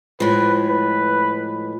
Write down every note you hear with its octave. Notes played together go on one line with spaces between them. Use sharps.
A2 F3 G#3 B4
B4